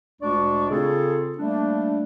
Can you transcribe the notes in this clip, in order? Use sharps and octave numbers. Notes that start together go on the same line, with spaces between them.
D2 A#2 G#3 D4 D5 C#6
C#3 C4 F4 G#4 A4
G3 A3 A#3 D4